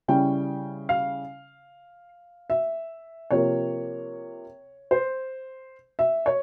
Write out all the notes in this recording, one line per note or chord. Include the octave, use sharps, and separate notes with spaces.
C#3 G3 C#4 E4 G5
F5
E5
C3 F3 A#3 C#5
C5
E5
C#5